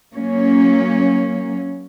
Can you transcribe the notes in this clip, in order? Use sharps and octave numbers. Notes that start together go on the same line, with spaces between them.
F#3 A#3 C#4